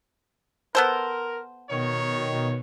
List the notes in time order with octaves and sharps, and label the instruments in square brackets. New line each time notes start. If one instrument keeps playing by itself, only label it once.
[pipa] B3 A4 C5 [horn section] A#4
[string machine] B2 [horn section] D#3 C#5